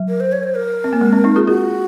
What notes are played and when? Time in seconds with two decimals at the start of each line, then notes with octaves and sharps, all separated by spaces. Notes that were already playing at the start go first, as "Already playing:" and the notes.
Already playing: F#3
0.08 A#4
0.20 C5
0.32 C#5
0.43 C5
0.55 A#4
0.84 C4
0.93 A#3
1.01 G#3
1.13 C4
1.24 C4 D#4
1.36 F4 G#4
1.47 F4 F#4 G#4